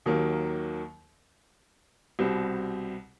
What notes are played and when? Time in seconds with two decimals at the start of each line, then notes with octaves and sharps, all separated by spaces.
0.06 D#2 D#3 F#3 A#3
2.19 C2 B2 G3 C4